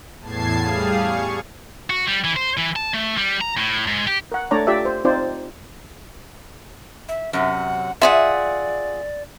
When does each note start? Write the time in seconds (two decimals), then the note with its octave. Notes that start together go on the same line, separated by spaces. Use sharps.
0.21 E2 A2 A5 G#6 C7
0.60 G3 G#4 F5
0.98 C#6
1.90 F#4
2.07 G3
2.24 E3
2.36 C5
2.57 E3
2.76 A5
2.94 A3
3.18 G3
3.41 A#5
3.57 A2
3.87 G#2
4.07 G4
4.32 A#4 F#5
4.51 A3 D4 C#5 D5 A#5
4.67 F4 G4 D5 E5
4.85 C5
5.05 C4 D#4 F4 C5 D5
7.08 E5
7.33 F#2 C3 F#5
8.01 F4 G#4 D5 E5 F#5